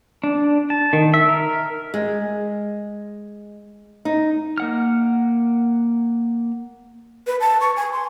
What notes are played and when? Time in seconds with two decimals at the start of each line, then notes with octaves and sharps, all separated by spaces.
0.24 D4
0.70 A5
0.93 D#3
1.14 E5
1.29 A#4
1.94 G#3
4.05 D#4
4.58 A#3 F#5 F6
7.27 B4
7.40 A5
7.60 C#6
7.77 G#5
7.92 C6